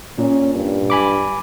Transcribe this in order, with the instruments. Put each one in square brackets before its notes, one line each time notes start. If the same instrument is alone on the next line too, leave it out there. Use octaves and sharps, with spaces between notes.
[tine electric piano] A#2 [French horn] C#4
[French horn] G2
[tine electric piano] G#5 B5 D6